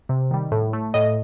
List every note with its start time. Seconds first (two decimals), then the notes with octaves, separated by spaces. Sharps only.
0.09 C3
0.31 D#3 G3
0.52 A2
0.73 A3
0.94 A2 D#5